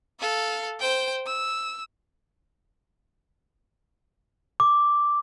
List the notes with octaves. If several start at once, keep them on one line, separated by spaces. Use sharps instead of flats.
A4 F5
C5 G5
E6
D6